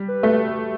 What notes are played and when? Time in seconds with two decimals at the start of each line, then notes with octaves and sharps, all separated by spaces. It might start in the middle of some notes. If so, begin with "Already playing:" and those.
Already playing: G3
0.08 B4
0.23 A3